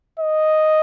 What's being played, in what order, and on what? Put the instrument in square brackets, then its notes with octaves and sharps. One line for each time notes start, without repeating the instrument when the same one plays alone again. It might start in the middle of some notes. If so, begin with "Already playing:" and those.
[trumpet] D#5